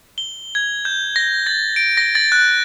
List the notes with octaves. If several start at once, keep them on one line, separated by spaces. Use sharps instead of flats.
G7
G#6
G6
A#6
A6
D7
A#6
A6
F#6